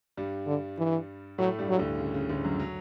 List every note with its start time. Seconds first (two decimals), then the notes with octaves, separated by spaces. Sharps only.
0.17 G2 G3
0.47 D3
0.78 E3
1.38 A2 F#3 A3
1.58 G2 G3
1.68 F#3
1.79 D2 D3
1.99 C#3
2.14 C#3
2.29 D2 D3
2.44 F#2 F#3
2.60 F#3